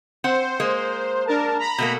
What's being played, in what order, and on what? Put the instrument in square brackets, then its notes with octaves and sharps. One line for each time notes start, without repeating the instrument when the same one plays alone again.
[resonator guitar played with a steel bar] C4 F#5 [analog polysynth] C5
[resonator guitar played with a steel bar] G#3 A#3
[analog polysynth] D4 A#4 A5
A#5 B5
[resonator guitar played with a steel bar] B2 A3 A#3